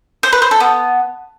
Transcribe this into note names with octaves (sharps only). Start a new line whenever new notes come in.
C5
B4
C5
A4
B3